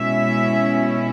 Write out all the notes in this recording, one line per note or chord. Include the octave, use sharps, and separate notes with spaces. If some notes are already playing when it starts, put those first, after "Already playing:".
Already playing: B2 G#3 C#4 E4 E5